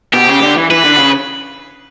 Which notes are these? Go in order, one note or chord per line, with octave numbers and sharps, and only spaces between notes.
B2 G4
C#3
D3
E3
E3 B4
D3
C#3